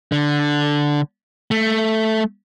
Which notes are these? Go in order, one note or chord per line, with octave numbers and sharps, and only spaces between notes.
D3
A3